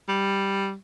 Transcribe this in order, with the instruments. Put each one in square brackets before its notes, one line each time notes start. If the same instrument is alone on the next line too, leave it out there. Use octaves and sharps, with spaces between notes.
[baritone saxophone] G3